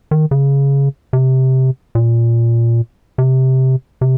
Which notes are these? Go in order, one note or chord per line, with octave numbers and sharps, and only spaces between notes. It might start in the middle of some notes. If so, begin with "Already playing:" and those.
D#3
C#3
C3
A#2
C3
C3